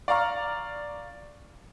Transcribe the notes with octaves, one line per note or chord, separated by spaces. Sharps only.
D5 F5 A#5 C#6 F6